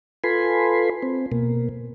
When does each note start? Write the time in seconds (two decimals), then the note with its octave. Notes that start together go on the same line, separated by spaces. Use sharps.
0.24 F4 A4 B4 G#5 B5 C6
1.03 C4
1.32 B2 A#3